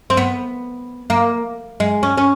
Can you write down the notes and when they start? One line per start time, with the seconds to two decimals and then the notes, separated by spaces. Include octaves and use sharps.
0.10 C4
0.17 B3
1.10 A#3
1.80 G#3
2.03 C#4
2.17 C#4